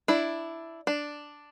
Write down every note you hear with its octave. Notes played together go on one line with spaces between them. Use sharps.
D4 E4
D4